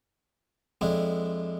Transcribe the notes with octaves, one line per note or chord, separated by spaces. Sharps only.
F2 G#3 D4 E4